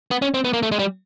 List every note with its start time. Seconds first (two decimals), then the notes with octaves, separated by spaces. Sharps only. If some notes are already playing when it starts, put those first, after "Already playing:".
0.11 B3
0.22 C#4
0.34 C4
0.45 B3
0.53 A#3
0.63 A3
0.72 G#3
0.79 G3